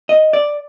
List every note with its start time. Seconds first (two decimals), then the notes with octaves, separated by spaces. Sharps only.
0.09 D#5
0.33 D5